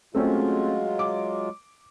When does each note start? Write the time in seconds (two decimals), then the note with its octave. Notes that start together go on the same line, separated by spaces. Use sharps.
0.15 F#3 G#3 A3 C4 C#4 F4
0.99 D6